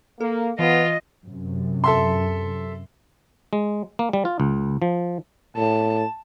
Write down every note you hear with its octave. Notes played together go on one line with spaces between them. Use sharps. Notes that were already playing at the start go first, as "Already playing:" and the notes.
A#3 A4
E3 B3 F4 D#5
F#2 C3
A4 E5 C6
G#3
A#3
G3
F4
C#2
F3
A2 A5